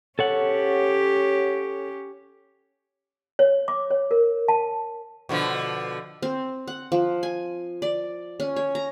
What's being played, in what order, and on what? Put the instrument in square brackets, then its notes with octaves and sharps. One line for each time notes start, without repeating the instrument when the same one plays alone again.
[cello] C#4 G4 [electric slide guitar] A4 C#5 F#5
[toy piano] C#5
D6
C#5
A#4
A5
[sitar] B2 D3 F3
[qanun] C4
F#5
F3
G#5
D5
C#4
C#5
A#5